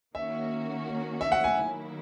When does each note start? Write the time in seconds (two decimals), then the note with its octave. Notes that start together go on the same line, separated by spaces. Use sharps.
0.15 D#3 A#3 C#4 F#4 E5
1.21 E5
1.32 F#5
1.44 G#5
1.56 D#3 F#3 A#3 E4